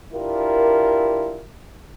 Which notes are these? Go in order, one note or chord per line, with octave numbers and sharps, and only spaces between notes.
D4 E4 F4 G4 A#4